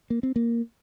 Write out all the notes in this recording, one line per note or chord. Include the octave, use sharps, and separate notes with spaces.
A#3
C4
A#3